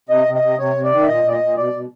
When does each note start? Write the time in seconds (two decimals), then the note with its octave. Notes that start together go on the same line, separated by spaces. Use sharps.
0.09 C3 D#5
0.26 C3
0.34 D#5
0.42 C3
0.59 C3 C#5
0.75 C3
0.84 D5
0.92 D#3
1.01 E5
1.07 A#2 D#5
1.24 A#2 D5
1.31 D#5
1.41 A#2
1.57 B2 D5
1.72 B2